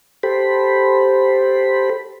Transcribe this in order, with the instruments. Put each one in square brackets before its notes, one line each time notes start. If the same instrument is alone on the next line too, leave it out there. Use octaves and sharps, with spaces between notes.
[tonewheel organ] G4 A4 C5 B5